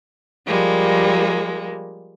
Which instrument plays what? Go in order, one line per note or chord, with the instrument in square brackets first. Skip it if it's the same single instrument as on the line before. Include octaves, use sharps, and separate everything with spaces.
[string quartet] F3 G3 G#3 A#3